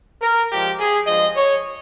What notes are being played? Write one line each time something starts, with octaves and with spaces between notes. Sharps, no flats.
A#4
A#2 F3 G#3 G4
G#4
G2 F3 G#3 D#5
C#5